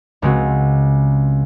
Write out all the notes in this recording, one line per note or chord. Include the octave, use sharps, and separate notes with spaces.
C#2 C#3 G#3 C4 F#4